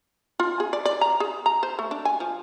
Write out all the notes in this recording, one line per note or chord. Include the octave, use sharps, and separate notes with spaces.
F4
G#4
D5
D5
A#5
G#4
A#5
C5
A3
D4
G#5
F3